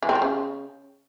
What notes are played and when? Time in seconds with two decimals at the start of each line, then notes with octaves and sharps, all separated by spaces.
0.03 E3
0.09 C4
0.15 F3
0.22 C#3